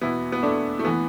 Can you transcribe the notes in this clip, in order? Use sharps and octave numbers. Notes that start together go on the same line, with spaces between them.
E2 B2 B3 E4
B3
A3 D4
A3
E2 E3 B3